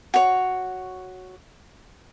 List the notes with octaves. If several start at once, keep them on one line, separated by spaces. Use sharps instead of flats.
F#4 C#5